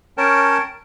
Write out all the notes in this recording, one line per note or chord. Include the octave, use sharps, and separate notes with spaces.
C#4 A#4 C#5 G5 A5